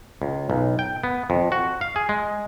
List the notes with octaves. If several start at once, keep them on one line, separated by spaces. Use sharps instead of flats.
C#2
B1
G5
B3
F2
F#4
F5
G#4
G#3